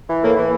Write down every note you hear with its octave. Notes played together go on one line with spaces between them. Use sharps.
E3
A2 A#3
E3